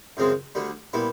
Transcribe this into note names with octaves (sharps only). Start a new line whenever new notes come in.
F#2 C#3 F3 G#3 C4
D2 D3 G3
A#2 G3 B3 E4